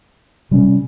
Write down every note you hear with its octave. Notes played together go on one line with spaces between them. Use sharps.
C3 G3 C#4